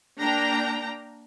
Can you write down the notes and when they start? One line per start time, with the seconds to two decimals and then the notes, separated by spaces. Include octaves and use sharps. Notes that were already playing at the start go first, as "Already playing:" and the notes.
0.20 A#3 D4 G5 A#5